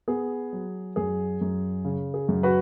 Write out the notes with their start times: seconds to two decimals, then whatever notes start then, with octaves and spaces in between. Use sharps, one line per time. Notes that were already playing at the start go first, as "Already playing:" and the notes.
0.08 B3 G#4
0.53 F#3
0.96 F#2 G#4
1.41 F#2
1.85 C#3
2.14 G#4
2.29 F#2
2.43 F#4 B4